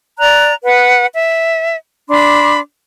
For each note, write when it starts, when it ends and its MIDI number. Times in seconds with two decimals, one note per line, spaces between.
0.19 0.53 74
0.19 0.53 82
0.19 0.53 90
0.65 1.06 71
0.65 1.06 78
1.13 1.75 76
2.09 2.60 62
2.09 2.60 83
2.09 2.60 84
2.09 2.60 86